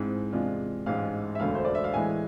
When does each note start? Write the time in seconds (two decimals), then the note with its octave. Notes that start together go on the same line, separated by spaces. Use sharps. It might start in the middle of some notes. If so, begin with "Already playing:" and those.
Already playing: G#2 G#3 C4 E4
0.33 E2 C3 G#3 D4 F4
0.86 A1 G#2 G#3 F5
1.35 E5
1.40 E1 D2 D3 F5
1.55 C5
1.65 D5
1.75 E5
1.84 F5
1.93 A2 E3 G#3 G#5